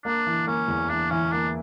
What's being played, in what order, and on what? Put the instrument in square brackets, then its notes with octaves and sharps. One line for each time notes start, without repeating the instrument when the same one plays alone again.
[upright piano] A#3 [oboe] D4
[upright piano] E3
[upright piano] A#3 [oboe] C#4
[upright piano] E2
[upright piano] E3 [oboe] D4
[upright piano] E3 [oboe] C#4
[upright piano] A#3 [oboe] D4